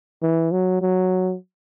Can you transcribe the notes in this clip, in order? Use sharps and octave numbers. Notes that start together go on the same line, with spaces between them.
E3
F#3
F#3